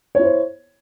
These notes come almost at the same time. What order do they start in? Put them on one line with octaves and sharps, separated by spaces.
C#5 E4 C5